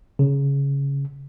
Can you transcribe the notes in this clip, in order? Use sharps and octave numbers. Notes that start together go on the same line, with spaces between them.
C#3